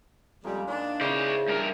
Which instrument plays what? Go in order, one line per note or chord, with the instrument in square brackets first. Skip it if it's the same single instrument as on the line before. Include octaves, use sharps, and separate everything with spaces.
[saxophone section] F2 G3 [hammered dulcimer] C#3 G#3 A#3
[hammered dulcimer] A#2 D#3 F4 [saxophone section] D4
[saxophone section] C#3 [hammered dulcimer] E3 [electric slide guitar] C5 D5
[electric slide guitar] G2 A#4 [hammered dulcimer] F3 D6